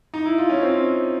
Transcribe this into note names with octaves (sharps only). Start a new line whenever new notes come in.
D#4
E4
F4
C#4
C4